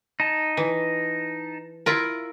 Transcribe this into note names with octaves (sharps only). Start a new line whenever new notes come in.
D#4 A5
E3
E4 F4 A#4